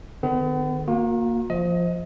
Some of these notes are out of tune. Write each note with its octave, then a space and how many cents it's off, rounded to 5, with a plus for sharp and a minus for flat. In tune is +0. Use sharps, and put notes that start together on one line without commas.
D#3 -35 B3 +40 G#4 +45
A#3 +0 F#4 -40
F3 +0 D#5 +25